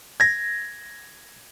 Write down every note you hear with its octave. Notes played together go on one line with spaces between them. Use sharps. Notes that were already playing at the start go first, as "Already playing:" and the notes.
G#6 A#6